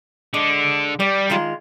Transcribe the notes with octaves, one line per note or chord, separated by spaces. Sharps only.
D3 G#3 D4
G3 D5
D#3 G#3 F4